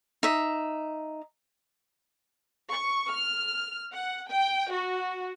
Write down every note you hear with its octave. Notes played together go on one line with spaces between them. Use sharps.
D#4 E5
C#6
F6
F#5
G5
F#4